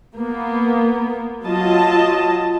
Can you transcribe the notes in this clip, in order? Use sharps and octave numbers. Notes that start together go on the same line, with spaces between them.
A#3 B3
F#3 F4 D#5 A5